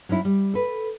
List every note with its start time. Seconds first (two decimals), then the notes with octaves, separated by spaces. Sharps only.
0.09 F#3 C#4 D#4 E4
0.25 G3
0.54 A4 B4